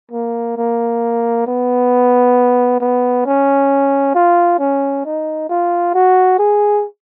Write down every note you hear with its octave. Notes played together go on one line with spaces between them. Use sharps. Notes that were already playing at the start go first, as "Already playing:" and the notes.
A#3
A#3
B3
B3
C#4
F4
C#4
D#4
F4
F#4
G#4